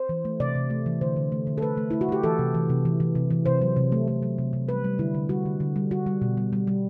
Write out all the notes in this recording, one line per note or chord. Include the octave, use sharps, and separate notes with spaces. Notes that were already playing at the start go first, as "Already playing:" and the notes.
Already playing: C5
E3
A3
C3 D5
C3
A3
E3
D3 C5
D3
A3
D3
A4
A3 B4
A3
A3 E4
F#4
A3 G4
E3 A4
C3
E3
C3
E3
E3
C3
E3
C3 C5
F#3
C3
A3
A3
F#3
C3
C3
G3 B4
G3
D3 E4
D3
G3 F#4
D3
D3
G3
G3 F#4
G3
B2
G3
G3
G3